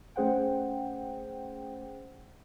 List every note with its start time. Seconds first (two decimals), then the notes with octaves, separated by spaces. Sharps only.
0.16 A3 C#4 G#4 C5 F#5 G5